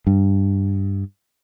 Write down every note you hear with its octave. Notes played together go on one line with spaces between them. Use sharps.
G2